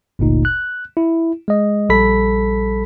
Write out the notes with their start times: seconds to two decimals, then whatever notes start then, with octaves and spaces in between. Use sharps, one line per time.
0.19 G1 D2 A#2 D#4
0.45 F#6
0.97 E4
1.48 G#3 D#5
1.89 A#1 G3 A4 B5 B6